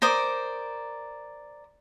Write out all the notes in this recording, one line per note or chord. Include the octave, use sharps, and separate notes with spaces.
A#4 C5 D5 D#6